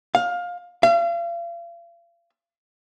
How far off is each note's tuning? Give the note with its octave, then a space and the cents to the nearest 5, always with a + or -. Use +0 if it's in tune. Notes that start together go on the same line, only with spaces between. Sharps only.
F5 +20
F5 -40